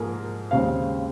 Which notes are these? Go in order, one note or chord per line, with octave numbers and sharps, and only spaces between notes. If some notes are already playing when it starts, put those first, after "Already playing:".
Already playing: G#2 F3 A#3 G#4 A#4
D#2 C#3 G#3 C4 F5